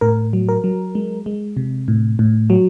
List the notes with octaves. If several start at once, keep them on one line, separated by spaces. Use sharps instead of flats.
A2 A#4
F#3
A#4
F#3
G#3
G#3
C3
A2
A2
F#3